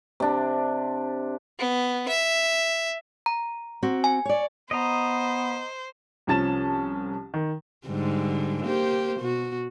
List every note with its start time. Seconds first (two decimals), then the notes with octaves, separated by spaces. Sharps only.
0.20 C3 D4
1.59 B3
2.08 E5
3.26 A#5
3.83 C4 F#4
4.04 G#5
4.25 C#5 D5
4.71 B3 C5 D#5 A#5
6.27 C2 F3 C#4 A5 A6 E7
7.34 D#3
7.87 G#2 D3 G3
8.64 A#3 G4 C5
9.20 B2 F#4